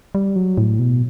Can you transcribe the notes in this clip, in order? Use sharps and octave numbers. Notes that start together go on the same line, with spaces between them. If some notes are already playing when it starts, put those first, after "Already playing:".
G3
F#3
A2
B2